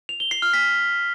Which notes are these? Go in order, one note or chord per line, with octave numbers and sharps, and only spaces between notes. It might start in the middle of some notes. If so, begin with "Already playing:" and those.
F7
G7
C7
F6
B6